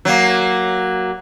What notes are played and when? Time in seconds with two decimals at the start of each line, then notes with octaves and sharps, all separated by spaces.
0.05 F#3 A#3